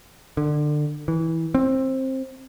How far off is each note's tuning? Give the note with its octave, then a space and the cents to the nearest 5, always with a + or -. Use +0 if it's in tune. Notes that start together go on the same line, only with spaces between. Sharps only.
D3 +25
E3 -15
C4 +15